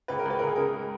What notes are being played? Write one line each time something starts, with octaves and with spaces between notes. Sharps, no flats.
C#2 B4
A#4
C#2 B4
C#2 A#4
G#4
C#3 A#4
G#3